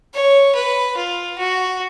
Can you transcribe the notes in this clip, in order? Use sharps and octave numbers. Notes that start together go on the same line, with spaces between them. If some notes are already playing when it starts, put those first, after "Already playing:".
C#5
B4
F4
F#4